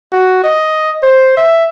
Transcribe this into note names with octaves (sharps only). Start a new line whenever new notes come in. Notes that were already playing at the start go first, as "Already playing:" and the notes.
F#4
D#5
C5
E5